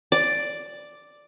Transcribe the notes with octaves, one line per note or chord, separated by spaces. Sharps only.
D5